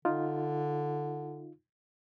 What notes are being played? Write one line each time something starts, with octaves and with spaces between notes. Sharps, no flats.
D3 D#4 F4